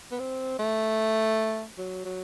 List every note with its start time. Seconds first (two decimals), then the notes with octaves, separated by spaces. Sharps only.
0.11 B3
0.19 C4
0.59 A3
1.78 F#3
2.05 F#3